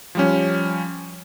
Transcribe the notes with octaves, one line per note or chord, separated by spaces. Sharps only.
F3 G3 C#4